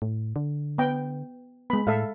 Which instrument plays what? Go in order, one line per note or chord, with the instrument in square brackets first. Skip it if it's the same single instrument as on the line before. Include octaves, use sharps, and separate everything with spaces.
[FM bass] A2
D3
[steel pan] B3 G5
[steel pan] G#3 B5 [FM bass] B3
[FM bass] A2 [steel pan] A4 E5 F5